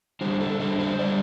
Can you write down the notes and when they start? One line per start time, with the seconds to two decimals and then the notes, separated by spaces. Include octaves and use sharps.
0.21 D3 G3 D4 C5
0.41 A4
0.59 D3 G3 D4 C5
0.80 C5
0.99 D3 G3 D4 D5